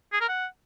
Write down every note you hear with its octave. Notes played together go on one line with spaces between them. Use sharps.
G#4
A#4
F#5